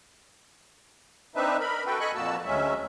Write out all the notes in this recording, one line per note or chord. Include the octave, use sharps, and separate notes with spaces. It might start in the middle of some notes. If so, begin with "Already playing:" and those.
C4 D4 D#4 B4 E5
A#4 B5
F#4 A4 B4 G5
A4 D#5 G#5 B5 C#6 F#6
F2 A#2 A#3 F#4 A5 E6
D2 F#3 G#3 C#4 E5